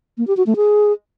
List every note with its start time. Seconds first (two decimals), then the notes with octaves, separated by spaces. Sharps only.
0.18 A#3
0.27 G4
0.37 F#4
0.47 A3
0.56 G#4